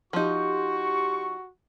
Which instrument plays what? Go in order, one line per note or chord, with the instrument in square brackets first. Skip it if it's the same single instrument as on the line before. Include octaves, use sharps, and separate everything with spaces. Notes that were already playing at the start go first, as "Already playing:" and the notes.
[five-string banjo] F3 D#4 [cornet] F#4 [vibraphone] G4 C6 [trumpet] C#6